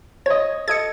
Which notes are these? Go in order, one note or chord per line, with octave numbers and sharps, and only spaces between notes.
C#5 D#5 G#6
A4 D#5 G#6 C#7